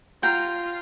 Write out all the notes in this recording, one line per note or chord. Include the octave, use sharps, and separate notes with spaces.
F4 G5 A#5